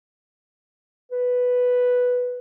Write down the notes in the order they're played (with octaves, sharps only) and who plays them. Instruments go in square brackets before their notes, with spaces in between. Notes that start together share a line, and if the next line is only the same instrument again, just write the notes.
[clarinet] B4